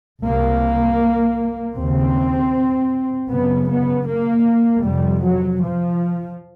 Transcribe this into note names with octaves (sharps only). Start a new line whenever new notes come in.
C2 C3 A#3
D#2 C#3 C4
F#2 C#3 B3
B3
A#3
F2 C3 G3
F#3
F3